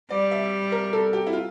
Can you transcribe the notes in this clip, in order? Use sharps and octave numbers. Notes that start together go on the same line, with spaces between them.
G3 D5
E5
A#4
A4
G4
E4
F4